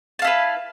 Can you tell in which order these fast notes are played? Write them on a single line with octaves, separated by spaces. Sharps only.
A5 F5 E4 B4